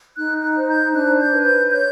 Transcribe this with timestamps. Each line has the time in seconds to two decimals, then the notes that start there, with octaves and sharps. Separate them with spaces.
0.16 D#4 F#6
0.42 F#6
0.55 C5
0.69 G6
0.94 D4 F#6
1.20 G6
1.32 B4
1.45 G6
1.71 C#5 G6